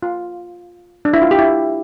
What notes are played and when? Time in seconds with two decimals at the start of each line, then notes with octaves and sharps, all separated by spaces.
0.03 F4
1.05 D4
1.13 E4
1.22 F4
1.31 G4
1.39 E4